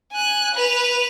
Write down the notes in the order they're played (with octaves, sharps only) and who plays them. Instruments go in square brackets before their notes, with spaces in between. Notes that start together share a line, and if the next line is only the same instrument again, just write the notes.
[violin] G#5 F#6
B4 F7